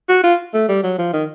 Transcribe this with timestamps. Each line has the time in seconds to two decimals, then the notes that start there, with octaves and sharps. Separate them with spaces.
0.09 F#4
0.23 F4
0.54 A3
0.68 G3
0.83 F#3
0.98 F3
1.13 D#3